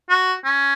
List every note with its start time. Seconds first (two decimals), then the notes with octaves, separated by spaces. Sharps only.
0.09 F#4
0.44 C#4